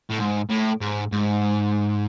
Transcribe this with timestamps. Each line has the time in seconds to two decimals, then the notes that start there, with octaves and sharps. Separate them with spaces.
0.10 A2
0.19 G#2
0.50 A2
0.81 G#2
1.12 G#2